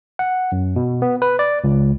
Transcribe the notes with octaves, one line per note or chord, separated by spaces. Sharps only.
F#5
F#2
B2
B3
B4
D5
C#2